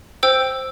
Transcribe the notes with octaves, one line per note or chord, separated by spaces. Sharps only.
C5 G5 E6